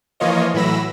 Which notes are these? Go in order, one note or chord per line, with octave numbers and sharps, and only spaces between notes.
E3 F3 A#3 F4 C#5 D#5
A2 E3 F#3 B5 E6 A#6